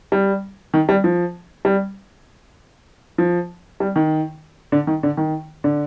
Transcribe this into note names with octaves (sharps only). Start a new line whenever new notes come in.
G3
D#3
G3
F3
G3
F3
G3
D#3
D3
D#3
D3
D#3
D3